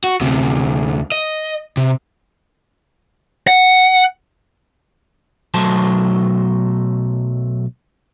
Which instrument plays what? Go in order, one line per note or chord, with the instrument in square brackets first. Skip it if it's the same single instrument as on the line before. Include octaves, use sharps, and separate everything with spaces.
[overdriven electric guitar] F#4
D2 C3
D#5
C3
[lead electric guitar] F#5
[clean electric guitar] B1 F#3 A3 C5 A5